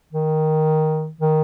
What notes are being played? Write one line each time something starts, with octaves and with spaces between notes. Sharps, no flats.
D#3
D#3